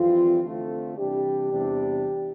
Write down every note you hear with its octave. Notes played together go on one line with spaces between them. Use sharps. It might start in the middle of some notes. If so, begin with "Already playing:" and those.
Already playing: F2 E3 G3 C4 F4
D3 A3 C4 F4
C3 E3 G3 D4 G4
E2 C3 G3 D4